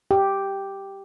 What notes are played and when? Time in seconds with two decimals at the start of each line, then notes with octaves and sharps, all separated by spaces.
0.11 G4